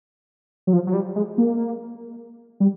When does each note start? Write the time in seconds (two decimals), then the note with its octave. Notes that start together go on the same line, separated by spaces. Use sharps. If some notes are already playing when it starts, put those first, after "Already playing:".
0.67 F#3
0.73 F3
0.87 F#3
0.94 G3
1.16 G#3
1.38 A#3
2.60 G3